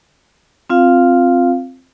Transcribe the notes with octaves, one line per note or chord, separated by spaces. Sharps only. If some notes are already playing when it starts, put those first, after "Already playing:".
C4 F4 F5